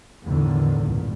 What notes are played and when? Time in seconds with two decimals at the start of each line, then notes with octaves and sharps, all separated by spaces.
0.25 E2 A2 D3 D#3
0.78 C#2 G2 A#2